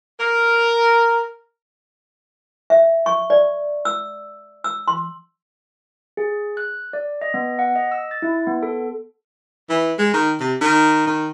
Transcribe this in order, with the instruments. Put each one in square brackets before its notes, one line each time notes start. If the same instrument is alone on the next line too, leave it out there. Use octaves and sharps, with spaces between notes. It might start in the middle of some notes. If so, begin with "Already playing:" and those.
[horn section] A#4
[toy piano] E5
C#6
D5
E6
E6
C6
[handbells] G#4
F#6
D5
D#5
B3
F#5
D#5
E6
A6
E4
B3
A4
[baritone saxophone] E3
G#3
D#3
C3
D#3
D#3